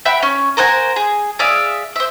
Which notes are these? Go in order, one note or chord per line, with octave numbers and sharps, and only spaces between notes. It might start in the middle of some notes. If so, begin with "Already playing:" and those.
E5 F#5 G5 B5
C#4
A#4 C5 F#5 G#5
G#4
G#4 D5 E5 F5
C5 E5